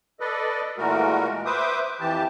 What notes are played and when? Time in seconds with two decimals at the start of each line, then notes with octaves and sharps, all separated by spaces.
0.20 A4 B4 D5 D#5
0.77 A#2 E3 G#3 A3 F#4 A#4
1.46 B4 C5 E5 D6 D#6
2.00 F2 E3 G4 A5